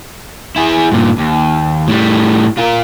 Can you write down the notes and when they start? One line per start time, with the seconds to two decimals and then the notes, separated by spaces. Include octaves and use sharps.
0.56 E4 G#4
0.92 G2 A#2
1.18 D#2
1.88 A2 G3
2.57 F4 A#4